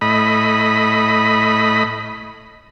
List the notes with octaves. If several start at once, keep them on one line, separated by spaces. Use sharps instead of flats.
A2 D#5 B5